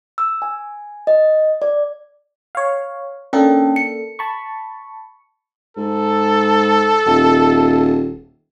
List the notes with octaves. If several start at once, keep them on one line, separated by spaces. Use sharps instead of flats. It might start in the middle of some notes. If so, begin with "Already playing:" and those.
E6
G#5
D#5
D5
C#5 F5
A#3 C#4 D4 A4 G5
C#7
A5 B5 C#6
G#2 A4
D#1